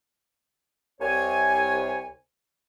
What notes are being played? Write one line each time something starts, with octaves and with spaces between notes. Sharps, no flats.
C2 C3 C#5 G#5